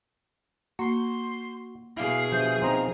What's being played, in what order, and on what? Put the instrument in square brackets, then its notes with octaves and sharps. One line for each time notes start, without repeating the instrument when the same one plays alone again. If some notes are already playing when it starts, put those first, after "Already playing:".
[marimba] A#3 [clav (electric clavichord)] F#4 [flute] C6
[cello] B2 G#4 [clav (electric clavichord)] E4 [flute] F5 [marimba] F6
[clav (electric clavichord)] F3 [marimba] D4 G4 E5 [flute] G6
[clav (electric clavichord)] F3 C4 D#4 [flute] A#5 [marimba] C6